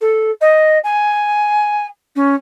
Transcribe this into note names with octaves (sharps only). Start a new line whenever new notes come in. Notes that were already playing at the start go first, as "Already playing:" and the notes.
A4
D#5
G#5
C#4